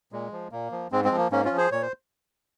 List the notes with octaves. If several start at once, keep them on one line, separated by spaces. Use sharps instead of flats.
A#2 G#3
F3
A#2 A#3
F3
G#2 G#3 C4
G#3 C4
F3
A#3
G#2 A#3 C#4
C#4 F4
F3
G#4 C5
A#2 C#5
C5